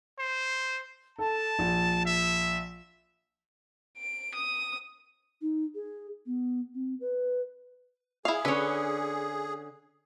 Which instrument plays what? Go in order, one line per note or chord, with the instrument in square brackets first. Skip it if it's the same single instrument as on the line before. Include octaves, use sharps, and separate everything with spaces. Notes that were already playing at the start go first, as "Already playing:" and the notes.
[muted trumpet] C5
[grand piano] A4 [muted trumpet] A5
[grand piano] A#1
[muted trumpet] E5
[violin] D7
D#6
[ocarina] D#4
G#4
B3
C4
B4
[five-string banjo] E4 F5 [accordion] G#4
[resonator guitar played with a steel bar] D3 C#4 [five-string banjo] B4 C#5